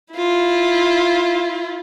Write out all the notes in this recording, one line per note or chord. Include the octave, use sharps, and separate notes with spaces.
E4 F4